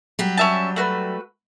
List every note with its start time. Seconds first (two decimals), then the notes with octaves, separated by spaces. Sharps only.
0.19 F#3 G3 G4
0.37 C#4 E5 A5
0.76 A3 F#4 B4